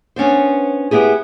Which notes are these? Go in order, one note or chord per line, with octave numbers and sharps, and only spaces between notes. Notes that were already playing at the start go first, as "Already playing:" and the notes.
B3 C#4 D4 C5
B3 E4 G4 G#4